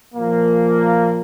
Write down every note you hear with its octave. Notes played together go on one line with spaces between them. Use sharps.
A#2 F3 A#3